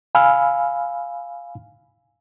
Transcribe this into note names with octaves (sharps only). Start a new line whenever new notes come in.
F5 G#5 B5 E6 F6